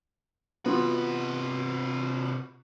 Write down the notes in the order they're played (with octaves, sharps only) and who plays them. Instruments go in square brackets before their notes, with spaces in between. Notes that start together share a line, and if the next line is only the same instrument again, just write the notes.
[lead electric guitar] C3 B4 [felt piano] B3 F4 F#4